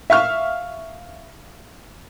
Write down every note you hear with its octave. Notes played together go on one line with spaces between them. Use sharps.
E5 F5 C#6 F6